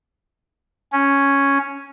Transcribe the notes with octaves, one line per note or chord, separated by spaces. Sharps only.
C#4